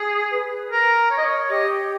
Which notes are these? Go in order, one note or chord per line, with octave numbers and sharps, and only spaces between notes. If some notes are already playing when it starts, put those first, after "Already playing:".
Already playing: G#4
B4
A#4
C#5
D#5
C#5
G4 D#5